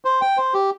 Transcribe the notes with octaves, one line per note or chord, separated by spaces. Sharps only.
C5
G5
C5
G4